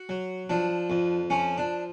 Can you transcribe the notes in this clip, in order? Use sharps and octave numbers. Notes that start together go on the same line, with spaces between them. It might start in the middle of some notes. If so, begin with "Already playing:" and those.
Already playing: F#4
F#3
F3 D4
F2
F3 C#4
D4